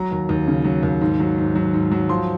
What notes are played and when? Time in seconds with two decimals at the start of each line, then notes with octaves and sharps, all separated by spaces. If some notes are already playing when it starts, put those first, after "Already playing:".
Already playing: F#3 A#5
0.11 D#2
0.29 D#2
0.48 C#3
0.64 F#3
0.83 D#2
1.01 G#2
1.20 F#3
1.38 G#2
1.55 F#3
1.74 G#2
1.92 F#3
2.09 F3 C6